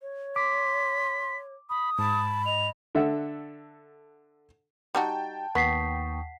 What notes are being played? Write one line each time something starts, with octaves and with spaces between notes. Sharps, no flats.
C#5
C6 D6 B6
B5 D#6
G#2 A5 B5
D#5 F7
D3 A4 E5 F#5
G3 D#4 F#4 G5 A5
D#2 B3 F#5 C#6 D#6 B6 C7